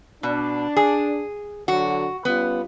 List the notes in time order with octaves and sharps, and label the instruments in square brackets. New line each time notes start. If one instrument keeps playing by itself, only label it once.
[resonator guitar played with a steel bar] B2 [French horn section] D4
[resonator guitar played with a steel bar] G#4
[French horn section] D3 F#3 [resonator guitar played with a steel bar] F#4
[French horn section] G3 C#4 F4 [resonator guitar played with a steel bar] B3